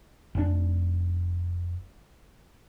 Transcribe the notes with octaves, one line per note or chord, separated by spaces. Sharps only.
F1 G#2 D4